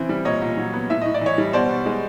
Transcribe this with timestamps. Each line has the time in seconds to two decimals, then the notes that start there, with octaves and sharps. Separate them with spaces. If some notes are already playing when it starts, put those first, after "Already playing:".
Already playing: C#3 E3 C4
0.09 G3
0.25 A#2 C#5 D#5
0.42 A#2
0.57 F#3
0.73 B3
0.89 A2 E5
1.02 A2 D#5
1.14 D5
1.21 E3 C#5 D#5
1.38 G3
1.53 B2 C5 D5
1.69 B2
1.86 G#3